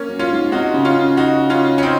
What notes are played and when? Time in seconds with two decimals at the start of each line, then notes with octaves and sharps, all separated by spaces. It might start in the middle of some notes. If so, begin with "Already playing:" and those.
Already playing: A#3 C#4
0.08 F#2
0.19 C#4 F4
0.31 G#2
0.52 C3 D#4 F#4
0.73 C#3
0.85 C#4 F4
0.96 C#3
1.17 D#4 F#4
1.50 C#4 F4
1.78 C#4
1.83 C4 D#4